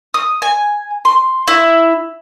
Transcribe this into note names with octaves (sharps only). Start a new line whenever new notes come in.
D#6
G#5
C6
E4